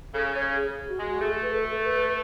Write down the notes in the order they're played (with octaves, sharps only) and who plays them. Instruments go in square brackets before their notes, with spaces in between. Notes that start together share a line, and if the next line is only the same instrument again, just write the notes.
[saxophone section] C#3 [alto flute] A4
[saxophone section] C#3 [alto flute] C#5
[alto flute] G#4
F#4
[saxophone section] G#3
[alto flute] F#4
[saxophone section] A3 [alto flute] G#4
[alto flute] B4
A4
A4
B4